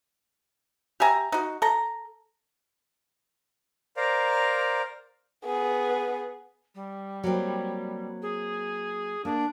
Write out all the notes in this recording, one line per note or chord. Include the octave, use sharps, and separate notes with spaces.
G4 E5 G#5 A#5
D#4 F#4
A4 A#5
A#4 C5 D5 F5 A#5
B3 G#4
G3
F#3 A#3 C4
G#4
A#3 D4